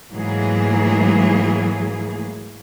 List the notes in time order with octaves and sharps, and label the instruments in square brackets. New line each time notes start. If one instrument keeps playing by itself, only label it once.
[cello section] G#2 E3 F#3 A3 A#3 G#4